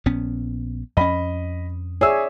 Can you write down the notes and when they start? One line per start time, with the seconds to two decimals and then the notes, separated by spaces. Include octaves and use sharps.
0.06 A#1 B3 C#4
0.97 F2 C#4 D#5 B5
2.01 G#4 C#5 D5 E5 E6